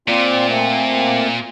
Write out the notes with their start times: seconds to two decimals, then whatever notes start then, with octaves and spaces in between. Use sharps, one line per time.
0.08 A#2 C4 F4 D5
0.48 A3 A#3 C4